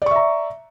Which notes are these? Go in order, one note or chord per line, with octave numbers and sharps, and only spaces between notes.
D5 E5 A#5 C#6